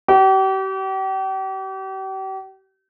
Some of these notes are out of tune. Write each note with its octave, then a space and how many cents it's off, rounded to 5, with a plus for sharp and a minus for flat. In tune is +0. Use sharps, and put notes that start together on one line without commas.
G4 -40